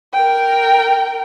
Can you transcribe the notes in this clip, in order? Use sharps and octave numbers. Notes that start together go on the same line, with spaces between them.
A#4 G5